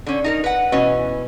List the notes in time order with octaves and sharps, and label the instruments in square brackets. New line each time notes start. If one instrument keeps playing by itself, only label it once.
[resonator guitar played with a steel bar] D3 C#4
D#4 A4 A#4
B4 F#5
[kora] B2 [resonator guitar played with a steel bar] E3 C#4